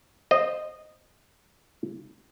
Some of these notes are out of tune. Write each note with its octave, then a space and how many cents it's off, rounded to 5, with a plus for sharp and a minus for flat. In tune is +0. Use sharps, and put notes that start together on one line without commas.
C5 +0 D#5 -15